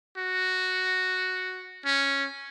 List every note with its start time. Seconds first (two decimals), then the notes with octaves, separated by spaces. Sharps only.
0.17 F#4
1.85 C#4